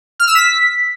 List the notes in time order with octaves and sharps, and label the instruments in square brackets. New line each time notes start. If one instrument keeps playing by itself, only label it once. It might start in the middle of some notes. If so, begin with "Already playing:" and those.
[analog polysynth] F6
E6
B6